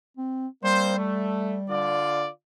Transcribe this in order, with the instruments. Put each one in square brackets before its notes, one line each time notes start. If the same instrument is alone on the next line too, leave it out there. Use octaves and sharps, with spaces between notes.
[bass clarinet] C4
[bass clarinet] G3 [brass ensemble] A#3 C4 C5
[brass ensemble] A3
D3 F4 D5